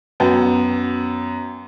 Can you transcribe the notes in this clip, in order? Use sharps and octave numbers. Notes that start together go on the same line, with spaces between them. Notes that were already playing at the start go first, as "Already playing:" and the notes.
F#2 B3 G5